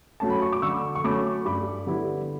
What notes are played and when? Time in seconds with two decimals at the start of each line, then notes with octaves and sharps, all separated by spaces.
0.20 F#3 A3 C#4 A5
0.30 B5
0.42 C#6
0.52 D6
0.62 D3 C#6 E6
0.95 C#6
1.04 F#3 A3 C#4 B5 D6
1.45 G2 B5 D6
1.87 D3 G3 B3 E4